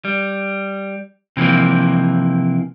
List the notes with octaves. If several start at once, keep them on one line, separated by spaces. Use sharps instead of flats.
G3
C3 E3 F3 A#3